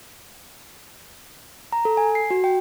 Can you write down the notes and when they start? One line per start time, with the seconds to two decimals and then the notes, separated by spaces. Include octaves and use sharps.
1.73 A#5
1.85 A4
1.97 G#5
2.15 C7
2.30 F#4
2.44 G5